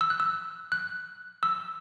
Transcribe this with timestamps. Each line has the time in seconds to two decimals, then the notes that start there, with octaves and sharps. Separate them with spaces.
0.01 E6
0.10 F#6
0.20 E6
0.72 F#6
1.43 E6